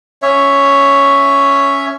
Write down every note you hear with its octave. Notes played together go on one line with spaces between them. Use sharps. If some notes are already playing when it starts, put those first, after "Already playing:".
C#4 C#5 E5